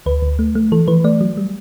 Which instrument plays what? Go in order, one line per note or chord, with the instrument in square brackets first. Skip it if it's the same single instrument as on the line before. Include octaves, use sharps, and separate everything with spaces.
[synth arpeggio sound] D2 B4
D2
A3
A3
E3 A4
E3 B4
A3 D5
F#3
G3